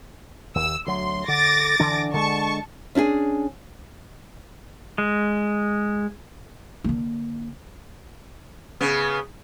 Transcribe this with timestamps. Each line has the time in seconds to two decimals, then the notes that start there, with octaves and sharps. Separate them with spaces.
0.55 D#2 E6
0.87 D2 F#3 C6
1.28 D3 D6 A6 A#6
1.80 D3 E3 D4
2.13 D3 G#3 A5 C#6
2.95 C#4 D4 G4 G#4
4.98 G#3
6.84 D3 A#3
8.81 C#3 B3